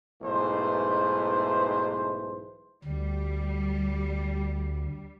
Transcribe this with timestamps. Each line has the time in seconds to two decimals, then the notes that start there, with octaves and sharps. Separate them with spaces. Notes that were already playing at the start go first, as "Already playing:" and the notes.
0.22 B1 G#2 E3 A3 B4 C5
2.85 D2 G3